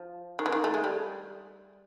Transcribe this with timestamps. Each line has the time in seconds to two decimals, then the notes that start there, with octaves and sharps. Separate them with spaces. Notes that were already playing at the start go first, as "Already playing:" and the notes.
Already playing: F3
0.39 D#3
0.46 E3
0.52 D#3
0.64 A3
0.74 G#3
0.84 G3